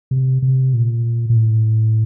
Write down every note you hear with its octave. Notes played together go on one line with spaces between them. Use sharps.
C3
C3
A#2
A#2
A2